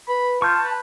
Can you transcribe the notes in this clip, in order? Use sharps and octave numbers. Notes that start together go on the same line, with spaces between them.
B4 B5
F4 A5 C#6 G6
B4